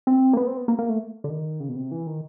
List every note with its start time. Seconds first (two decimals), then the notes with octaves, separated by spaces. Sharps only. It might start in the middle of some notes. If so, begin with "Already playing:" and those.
0.07 C4
0.33 A#3
0.37 B3
0.47 C4
0.57 B3
0.68 A#3
0.79 A#3
0.89 A3
1.24 D3
1.30 D#3
1.60 C#3
1.69 B2
1.76 C3
1.91 E3
2.07 D#3